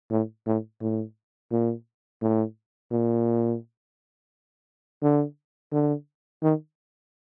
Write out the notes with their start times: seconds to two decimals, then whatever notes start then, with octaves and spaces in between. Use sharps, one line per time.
0.11 A2
0.46 A2
0.82 A2
1.51 A#2
2.22 A2
2.92 A#2
5.02 D3
5.72 D3
6.42 D#3